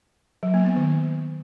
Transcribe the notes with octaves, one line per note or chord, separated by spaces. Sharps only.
F#3
A#3
B3
D#3